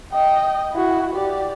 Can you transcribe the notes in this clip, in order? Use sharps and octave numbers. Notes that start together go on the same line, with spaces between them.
D#5 G5
E4 F#4
G4 D5